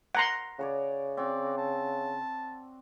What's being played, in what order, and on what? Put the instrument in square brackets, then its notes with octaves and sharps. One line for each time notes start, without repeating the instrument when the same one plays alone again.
[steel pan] F#5 A#5 C6
[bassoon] C#3 [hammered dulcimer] F#4 C#5 D5
[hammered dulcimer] C4 F#4 [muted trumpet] D5
[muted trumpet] A5